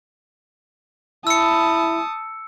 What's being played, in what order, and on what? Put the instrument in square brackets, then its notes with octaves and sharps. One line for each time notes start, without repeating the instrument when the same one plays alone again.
[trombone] E4 [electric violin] A5 D#6 [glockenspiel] E6 C#7